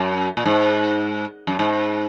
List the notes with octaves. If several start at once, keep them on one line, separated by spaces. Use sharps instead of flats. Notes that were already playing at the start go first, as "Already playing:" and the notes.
Already playing: F#2
A#2
G#2
F#2
G#2